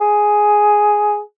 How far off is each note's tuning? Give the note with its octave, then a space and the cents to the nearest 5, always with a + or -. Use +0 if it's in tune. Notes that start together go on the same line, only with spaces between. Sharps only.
G#4 +5